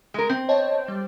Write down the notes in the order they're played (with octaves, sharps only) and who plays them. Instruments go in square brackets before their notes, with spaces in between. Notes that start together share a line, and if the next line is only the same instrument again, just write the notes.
[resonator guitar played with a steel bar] G#3 A#4
C4
[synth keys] C#5 D#5 A5
G3